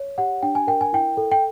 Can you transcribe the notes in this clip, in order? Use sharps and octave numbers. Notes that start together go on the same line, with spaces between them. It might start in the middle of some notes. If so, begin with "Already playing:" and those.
Already playing: C#5
G4 F#5
D4 G5
G#5
A#4 G5
G#5
E4 G5
A4
G5